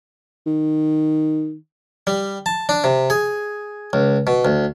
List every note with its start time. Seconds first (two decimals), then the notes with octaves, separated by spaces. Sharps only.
0.46 D#3
2.07 G3
2.46 A5
2.69 D4
2.84 C3
3.10 G#4
3.93 C#2
4.27 B2
4.45 D2